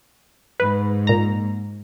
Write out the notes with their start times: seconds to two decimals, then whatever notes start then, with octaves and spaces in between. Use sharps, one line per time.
0.60 G#2 B4
1.07 A#2 A#5